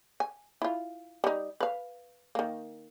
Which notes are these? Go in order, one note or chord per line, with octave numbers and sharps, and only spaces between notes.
G#5
E4 F4
G3 D#4
B4 F5
D#3 A#3